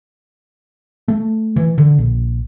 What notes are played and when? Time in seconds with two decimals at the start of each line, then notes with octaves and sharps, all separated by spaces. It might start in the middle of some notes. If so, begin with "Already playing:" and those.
1.08 A3
1.56 E3
1.78 D3
1.98 A#1